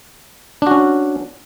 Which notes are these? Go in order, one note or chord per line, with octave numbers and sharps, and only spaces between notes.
C#4 D4 F#4